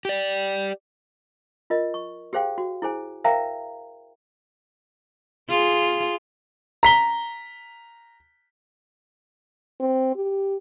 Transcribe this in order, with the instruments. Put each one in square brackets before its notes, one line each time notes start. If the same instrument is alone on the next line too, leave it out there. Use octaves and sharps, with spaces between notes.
[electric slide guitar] G4 D5
[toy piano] F4 A#4 D#5
C#6
G4 G#4 C5 F5 G5
F#4
E4 G#4 C5 G#5
A#4 C5 E5 F5 G5 A#5
[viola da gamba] F4 G#4
[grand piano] A#5 B6 G7
[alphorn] C4
G4